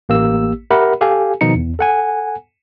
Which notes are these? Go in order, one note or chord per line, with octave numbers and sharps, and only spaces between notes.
A1 A#3 G4 E6
G4 A#4 E5 F#5 B5
G4 A4 F5 G#5
B2 D#3 F3 D#4 C#7
E2
A4 F#5 G#5